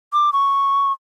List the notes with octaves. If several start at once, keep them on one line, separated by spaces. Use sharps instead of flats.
D6
C#6